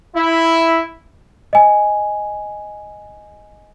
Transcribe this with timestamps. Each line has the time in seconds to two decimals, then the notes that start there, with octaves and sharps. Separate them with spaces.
0.16 E4
1.53 D#5 G#5